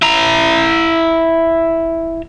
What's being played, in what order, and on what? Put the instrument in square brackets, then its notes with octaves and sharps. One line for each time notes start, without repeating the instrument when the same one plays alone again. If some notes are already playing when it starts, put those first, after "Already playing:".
[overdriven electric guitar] E4 A#5